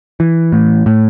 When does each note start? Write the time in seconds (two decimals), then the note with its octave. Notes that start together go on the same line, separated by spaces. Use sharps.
0.20 E3
0.52 A2
0.86 A2